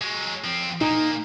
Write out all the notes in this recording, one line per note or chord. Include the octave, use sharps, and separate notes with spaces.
F#3 G#3
F3 C4
A#2 A#3 D#4